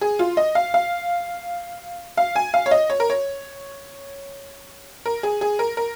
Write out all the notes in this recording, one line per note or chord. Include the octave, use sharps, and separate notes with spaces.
G#4
F4
D#5
F5
F5
F5
G#5
F5
C#5
D#5
C#5
A#4
C#5
A#4
G#4
G#4
A#4
A#4